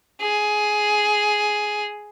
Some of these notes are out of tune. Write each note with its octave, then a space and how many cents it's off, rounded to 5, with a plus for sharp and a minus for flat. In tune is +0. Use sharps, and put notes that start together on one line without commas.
G#4 +10